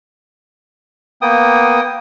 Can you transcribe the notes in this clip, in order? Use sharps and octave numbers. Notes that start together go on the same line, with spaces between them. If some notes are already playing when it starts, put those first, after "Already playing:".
A#3 B3 G5 D#6